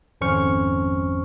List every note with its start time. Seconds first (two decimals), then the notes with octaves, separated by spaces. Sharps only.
0.21 G#1 F2 C#4 C5 C#6 F6